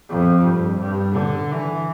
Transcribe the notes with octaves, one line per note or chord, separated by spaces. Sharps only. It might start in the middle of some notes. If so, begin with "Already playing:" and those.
F2
G2
G2
D3
E3